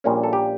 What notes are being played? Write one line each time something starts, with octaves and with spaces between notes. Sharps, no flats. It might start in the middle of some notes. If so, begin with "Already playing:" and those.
A#1 A#2 G3 A#3 C#4
A4
G4